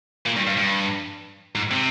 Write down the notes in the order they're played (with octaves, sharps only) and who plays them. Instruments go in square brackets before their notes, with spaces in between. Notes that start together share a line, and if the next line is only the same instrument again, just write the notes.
[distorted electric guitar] A#2
G2
G2
G2
G#2
C3